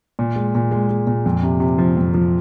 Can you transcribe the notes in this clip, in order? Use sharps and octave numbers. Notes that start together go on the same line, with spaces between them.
A#2
G#3
A#2
G#3
G#3
A#2
F2
C3
C3
F3
F2
F3